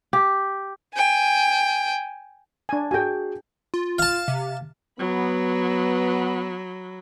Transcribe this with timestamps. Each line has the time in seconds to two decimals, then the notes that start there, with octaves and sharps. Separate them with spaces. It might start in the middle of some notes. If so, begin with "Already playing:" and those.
0.13 G4
0.94 G5 G#5
2.69 D4 G#5
2.91 F#4 G#4 G5 G#5
3.74 F4
3.99 F5 A5
4.28 C3
4.99 F#3 B3 B5